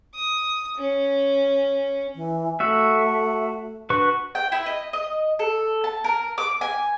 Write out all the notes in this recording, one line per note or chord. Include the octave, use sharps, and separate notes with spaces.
D#6
C#4
E3
A3 F#4 E5
D4 F#4 B4 C#6
G5
E4
D#5
D#5
A4
A5
A#4
D6
G#5